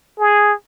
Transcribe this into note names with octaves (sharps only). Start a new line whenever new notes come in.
G#4